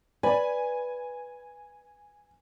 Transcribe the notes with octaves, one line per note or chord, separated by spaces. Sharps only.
B4 D5 G#5 B5